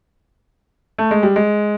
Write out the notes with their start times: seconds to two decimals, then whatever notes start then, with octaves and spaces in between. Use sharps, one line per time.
0.98 A3
1.11 G#3
1.23 G3
1.36 G#3